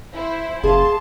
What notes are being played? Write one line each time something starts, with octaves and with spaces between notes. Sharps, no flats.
E4 C5 E5
F#1 G#4 F5 A5 C6